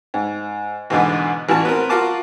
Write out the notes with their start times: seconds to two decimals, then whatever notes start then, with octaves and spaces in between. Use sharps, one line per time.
0.14 G#2
0.90 E2 G#2 B2 D3 B3
1.49 A1 E3 F#4 A5
1.65 B3 C4 A#4
1.89 F4 F#4 A#4 F5 A5 D6